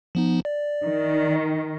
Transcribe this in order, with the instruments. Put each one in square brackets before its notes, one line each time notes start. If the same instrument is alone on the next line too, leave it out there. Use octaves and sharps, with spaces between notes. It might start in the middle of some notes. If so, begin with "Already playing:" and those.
[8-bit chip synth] F3 B3 D#4
D5
[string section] D#3